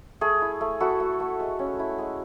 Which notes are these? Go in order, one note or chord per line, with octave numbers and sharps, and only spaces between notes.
A3 G#4
E4
A3
E4 F#4 A4
A3
A3
G#3
C#4
E4
G#3